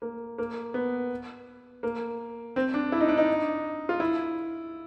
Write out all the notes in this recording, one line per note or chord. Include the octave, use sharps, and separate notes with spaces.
A#3
A#3
B3
A#3
C4
D4
E4
D#4
D4
D#4
F4
E4